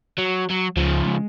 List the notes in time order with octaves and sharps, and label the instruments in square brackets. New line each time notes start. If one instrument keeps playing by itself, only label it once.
[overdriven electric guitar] F#3
F#3
[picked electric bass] C#2 [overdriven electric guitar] C#3 F3
[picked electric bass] G#3